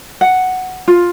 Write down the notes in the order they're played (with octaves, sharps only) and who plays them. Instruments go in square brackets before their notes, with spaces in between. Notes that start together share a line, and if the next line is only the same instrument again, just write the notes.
[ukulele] F#5
F4